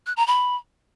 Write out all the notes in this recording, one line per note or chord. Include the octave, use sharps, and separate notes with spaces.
F#6
A#5
B5